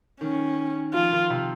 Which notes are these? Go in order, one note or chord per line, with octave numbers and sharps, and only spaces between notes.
D#3 C#4
F3 F4
D#3
C3